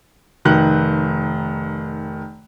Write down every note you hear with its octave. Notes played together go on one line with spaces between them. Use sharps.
F1 D#3 F#6